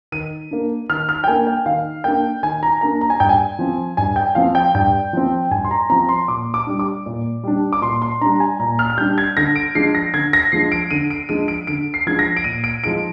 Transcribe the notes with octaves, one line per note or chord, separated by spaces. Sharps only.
D#3 D#7
A#3 D4
D#3 F6
F6
G5
A#3 D4 G#5
G5
D#3 F5
A#3 D4 G5
D#3 G#5
A#5
A#3 D4 A#5
A#5
G#5
G2 G5
G#5
F3 C4
G2 G#5
G5
F3 C4 F5
G5
G2 G5
F3 C4
G2 G#5
C6
A#5
F3 C4 A#5
C6
A#2 D6
D6
G3 D4
D6
A#2
G3 D4
D6
A#2 C6
C6
G3 D4 A#5
G#5
A#2 A#5
F6
F6
G3 D4 G6
G#6
D3 A#6
D7
F3 G#3 D4 C7
A#6
D3 G#6
A#6
F3 G#3 D4 C7
D7
D3 D#7
D7
F3 G#3 D4 D#7
D7
D3 D7
C7
F3 G#3 D4 G#6
A#6
D7
A#2 D#7
D7
F3 G#3 D#4 D7